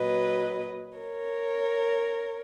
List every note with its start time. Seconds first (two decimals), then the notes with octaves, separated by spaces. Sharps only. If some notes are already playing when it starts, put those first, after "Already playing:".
Already playing: A#2 F#3 B4 D#5
0.98 A#4 C#5